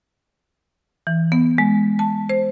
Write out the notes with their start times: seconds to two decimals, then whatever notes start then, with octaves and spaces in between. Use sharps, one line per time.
1.07 E3
1.32 B3
1.58 G#3
1.99 A5
2.29 C5